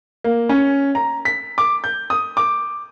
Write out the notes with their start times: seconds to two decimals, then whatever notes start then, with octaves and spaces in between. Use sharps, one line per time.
0.24 A#3
0.49 C#4
0.95 A#5
1.25 B6
1.58 D6
1.84 G6
2.10 D#6
2.37 D6